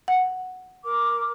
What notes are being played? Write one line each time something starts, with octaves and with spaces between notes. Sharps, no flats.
F#5
A#4 D6